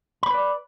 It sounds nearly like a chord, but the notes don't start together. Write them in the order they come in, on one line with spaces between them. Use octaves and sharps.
B5 C5 B4 D5